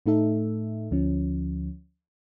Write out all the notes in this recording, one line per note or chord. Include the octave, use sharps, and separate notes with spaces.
A2 A3 D#4 A4 E5
D2 F3 C#4